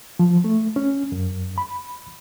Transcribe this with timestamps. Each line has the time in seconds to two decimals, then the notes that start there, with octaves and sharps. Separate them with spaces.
0.19 F3
0.44 A3
0.76 C#4
1.12 F#2
1.58 B5